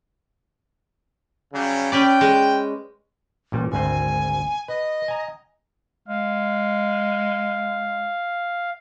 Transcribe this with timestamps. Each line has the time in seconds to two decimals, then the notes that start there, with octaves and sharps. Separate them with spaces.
1.54 C#3 F#3 G3
1.92 C#4 B4 D5 G5
2.21 G#3
3.52 A1 A#2 G3
3.72 G#1 D2 C4 G#5
4.68 B4 D#5
5.08 G#5 A#5
6.08 G#3 F5